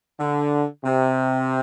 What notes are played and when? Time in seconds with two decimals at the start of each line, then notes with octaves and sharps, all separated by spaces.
0.20 D3
0.84 C3